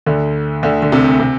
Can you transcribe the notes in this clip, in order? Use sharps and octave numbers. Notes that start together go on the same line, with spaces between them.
D2 D3
D2 D3
D3
C2 C3
C3